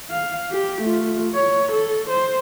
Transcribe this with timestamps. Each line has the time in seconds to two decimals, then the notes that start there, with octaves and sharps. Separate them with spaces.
0.10 F5
0.52 G4
0.82 A3 F4
1.35 C#5
1.72 A4
2.10 C5